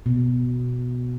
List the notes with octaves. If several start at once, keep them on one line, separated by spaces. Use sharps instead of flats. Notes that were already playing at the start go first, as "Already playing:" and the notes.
B2